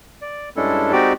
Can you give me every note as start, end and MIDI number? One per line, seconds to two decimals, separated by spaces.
0.21 0.49 74
0.56 0.92 43
0.56 0.92 56
0.56 0.92 61
0.56 0.92 62
0.56 0.92 64
0.56 0.92 69
0.92 1.13 56
0.92 1.13 60
0.92 1.13 63
0.92 1.13 66
0.92 1.13 67
0.92 1.13 74